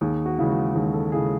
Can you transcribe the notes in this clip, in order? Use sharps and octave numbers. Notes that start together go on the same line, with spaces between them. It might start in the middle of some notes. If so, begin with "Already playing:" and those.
D#2 G#4
F#4
C#3 E3 G#3
F#4
D#2 G#4
A4
C#3 E3 G#3 G#4